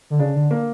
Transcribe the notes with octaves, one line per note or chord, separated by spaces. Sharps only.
D3
C#3 D4
D3
A#3